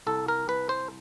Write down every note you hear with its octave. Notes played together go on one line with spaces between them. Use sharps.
C2 A4
A#4
C2 B4
C5